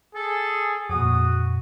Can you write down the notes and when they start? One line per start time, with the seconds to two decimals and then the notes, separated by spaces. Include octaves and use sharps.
0.15 G#4 A4
0.89 F2 A#2 F#4 D#6